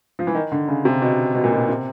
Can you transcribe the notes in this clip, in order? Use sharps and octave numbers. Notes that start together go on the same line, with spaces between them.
F3
E3
D#3
D3
C#3
C3
B2
B2
A#2
B2
C3